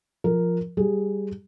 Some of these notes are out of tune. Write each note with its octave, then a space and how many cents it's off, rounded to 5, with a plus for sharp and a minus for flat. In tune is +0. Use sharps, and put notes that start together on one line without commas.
F3 +0 A#4 +0
G3 +0 G#4 +0